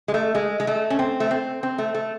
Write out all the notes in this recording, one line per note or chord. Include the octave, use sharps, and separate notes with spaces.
G#3
A3
G#3
G#3
A3
C#4
C4
A3
C4
C4
A3
A3